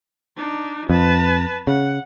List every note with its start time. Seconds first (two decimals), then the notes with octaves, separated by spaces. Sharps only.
0.37 D4 D#4
0.90 F2 B4 A5
1.67 C#3 F#5